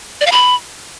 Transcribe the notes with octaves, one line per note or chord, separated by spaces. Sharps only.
D5
F5
B5